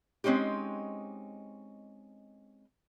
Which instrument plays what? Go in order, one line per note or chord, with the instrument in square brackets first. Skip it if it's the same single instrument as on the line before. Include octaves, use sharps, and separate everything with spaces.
[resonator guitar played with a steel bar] G#3 C4 C#4 D#4 G4